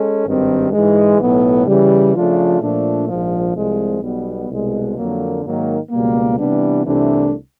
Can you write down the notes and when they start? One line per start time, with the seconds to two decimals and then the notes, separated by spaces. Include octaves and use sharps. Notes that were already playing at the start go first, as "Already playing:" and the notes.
Already playing: G#3 C#4 A4
0.25 G#1 G2 D#3 G3 C4
0.72 G#2 E3 G#3
1.19 B1 A2 F#3 B3
1.66 C#3 E3 G3
2.14 C#3 F3 A3 D4 F4
2.61 A#2 F3 A3 D4
3.08 A#1 G#2 F3
3.55 C2 C3 F3 G#3
4.02 B1 B2 G3 B3
4.50 C2 B2 G#3
4.97 F2 D3 F#3 A#3
5.44 G#2 D#3 F#3 A#3
5.91 C#2 B2 G3 A#3
6.38 C3 E3 G3 B3 D4
6.85 C2 C3 E3 A3 D4